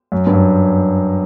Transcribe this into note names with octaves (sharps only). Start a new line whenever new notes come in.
F#2
G2
F#2